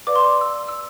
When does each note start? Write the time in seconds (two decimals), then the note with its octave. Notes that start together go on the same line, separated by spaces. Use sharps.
0.07 B4 D5 F5 D6
0.16 C6
0.24 D6
0.41 E6
0.69 E6